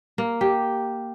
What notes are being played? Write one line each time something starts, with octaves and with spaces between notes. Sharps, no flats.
A#3
G4